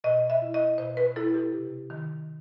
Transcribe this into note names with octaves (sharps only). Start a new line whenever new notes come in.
B2 D#5
E5
E4
D#5
B2 C5
B4
E4 A4
G4
C3
D#3